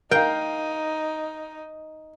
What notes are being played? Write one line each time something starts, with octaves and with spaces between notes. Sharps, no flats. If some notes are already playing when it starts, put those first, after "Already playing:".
D#4 A#4 F5 G5